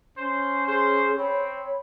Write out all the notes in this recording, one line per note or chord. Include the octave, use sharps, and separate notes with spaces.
C#4 C5
G#4 C5
C4 C#5 B5